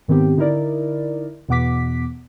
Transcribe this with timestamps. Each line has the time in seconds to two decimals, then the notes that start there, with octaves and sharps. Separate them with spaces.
0.08 G#2 D#3 B3 C4 G4
0.37 D3 D#4 E4 A#4 D5
1.48 E2 B2 B3 F#5 D6 B6